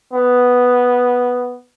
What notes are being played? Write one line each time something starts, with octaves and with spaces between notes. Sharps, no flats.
B3